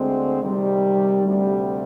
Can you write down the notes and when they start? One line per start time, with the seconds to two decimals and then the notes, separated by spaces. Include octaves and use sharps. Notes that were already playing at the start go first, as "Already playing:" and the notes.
Already playing: D2 D3 G#3 C4
0.42 C3 D#3 G3
1.23 D2 C3 G3